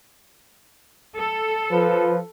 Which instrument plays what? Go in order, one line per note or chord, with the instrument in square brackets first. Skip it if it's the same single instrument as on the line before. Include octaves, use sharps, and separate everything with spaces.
[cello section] A4
[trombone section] F3 B4